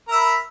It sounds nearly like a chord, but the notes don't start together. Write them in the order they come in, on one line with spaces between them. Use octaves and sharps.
A#4 E5 B5